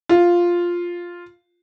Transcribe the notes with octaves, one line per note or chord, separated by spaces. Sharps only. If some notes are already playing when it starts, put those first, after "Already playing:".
F4